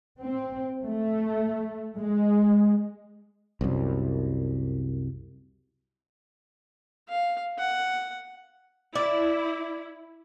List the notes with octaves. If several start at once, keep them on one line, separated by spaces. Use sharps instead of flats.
C4
A3
G#3
C2 F#2
F5
F#5
E4 D5